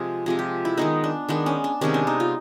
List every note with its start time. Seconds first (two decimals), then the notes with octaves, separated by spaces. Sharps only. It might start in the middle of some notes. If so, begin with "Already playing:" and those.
Already playing: C3 F3 G#3 G#4
0.26 C3 F3 G#3 G#4
0.39 G4
0.65 E4
0.77 D#3 G#3 B3 D#4
1.04 D4
1.29 D#3 G#3 B3 D4
1.46 C#4
1.64 D4
1.81 C3 D#3 G#3 B3 C#4
1.94 D4
2.07 D#4
2.20 F4